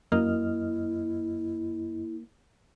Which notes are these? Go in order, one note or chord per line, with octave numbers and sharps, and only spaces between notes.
F#2 A#3 E4 D#5 F6